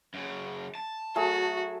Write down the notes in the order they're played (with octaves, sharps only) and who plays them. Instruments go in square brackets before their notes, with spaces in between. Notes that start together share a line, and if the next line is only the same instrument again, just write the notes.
[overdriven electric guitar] F#2 C#3
A5
[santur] F#3 A3 G#4 [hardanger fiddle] F#4